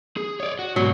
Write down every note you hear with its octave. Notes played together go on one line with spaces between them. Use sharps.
G#4
C#5 D5
F#4
G#2 B2 F#3